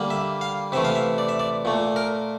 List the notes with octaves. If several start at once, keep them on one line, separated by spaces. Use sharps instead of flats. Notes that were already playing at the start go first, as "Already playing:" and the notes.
Already playing: D3 G3 A#3
E5
F5
C3 E3 A3 E5
F5
E5
D5
E5
D5
A#2 A3
A#4